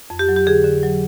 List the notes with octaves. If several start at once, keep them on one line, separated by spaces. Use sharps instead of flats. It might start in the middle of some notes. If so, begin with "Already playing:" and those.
F2
G4
F#3
G4
D3 G#4
D3
F#3